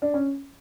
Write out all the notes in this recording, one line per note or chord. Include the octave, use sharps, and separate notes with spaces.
D4
C#4